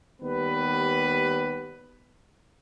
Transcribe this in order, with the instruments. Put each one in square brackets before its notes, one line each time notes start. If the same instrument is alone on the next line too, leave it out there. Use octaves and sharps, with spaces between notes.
[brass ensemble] D#2 G3 B3 B4